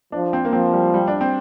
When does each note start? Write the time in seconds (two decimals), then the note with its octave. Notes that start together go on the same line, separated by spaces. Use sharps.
0.12 F3 D4
0.33 C4
0.45 A#3
0.53 F3 C4
0.73 G3
0.94 G3
1.07 D4
1.21 C4